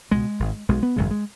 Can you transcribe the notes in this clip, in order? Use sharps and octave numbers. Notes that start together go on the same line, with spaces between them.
C#2 B2 G#3
G#1 G#2
B1 B2 G#3
B3
G#1 F#2 C#3 G#3
G#3